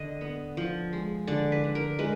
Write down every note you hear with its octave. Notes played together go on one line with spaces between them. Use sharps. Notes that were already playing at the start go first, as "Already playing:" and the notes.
Already playing: D3 D#5
B3
F3
G#3
D3 D5
B4
D3
A#4
G#3 B4